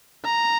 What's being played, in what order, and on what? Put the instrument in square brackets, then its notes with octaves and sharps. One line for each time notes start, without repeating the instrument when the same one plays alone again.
[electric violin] A#5